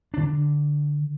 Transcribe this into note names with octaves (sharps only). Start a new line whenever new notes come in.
D3 D4